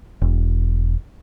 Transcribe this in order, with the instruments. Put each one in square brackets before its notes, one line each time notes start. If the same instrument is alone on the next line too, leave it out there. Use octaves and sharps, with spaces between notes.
[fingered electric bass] E1